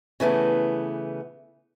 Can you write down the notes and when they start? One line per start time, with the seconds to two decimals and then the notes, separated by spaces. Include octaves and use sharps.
0.20 C#3 E3 A3 B3